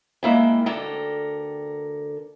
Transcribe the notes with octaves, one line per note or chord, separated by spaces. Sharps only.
G#3 A#3 E4 G5
D2 D3 A4 A#4 G5